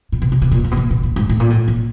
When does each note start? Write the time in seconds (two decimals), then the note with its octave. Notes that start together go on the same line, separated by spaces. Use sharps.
0.12 A#2
0.22 B2
0.32 C3
0.42 B2
0.52 A#2
0.64 A#2
0.71 B2
0.77 A#2
0.91 B2
1.03 A#2
1.16 G#2
1.29 A2
1.40 A#2
1.50 A2
1.68 A#2